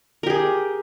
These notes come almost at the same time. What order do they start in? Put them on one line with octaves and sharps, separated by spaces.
A#4 G4 G#4